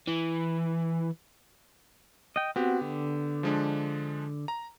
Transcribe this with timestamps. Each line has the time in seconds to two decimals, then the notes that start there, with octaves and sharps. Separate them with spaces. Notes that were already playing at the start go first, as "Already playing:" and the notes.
0.07 E3
2.36 D#5 G5
2.56 B3 C4 F#4 G4
2.81 D3
3.43 F3 G#3 D4
4.48 A#5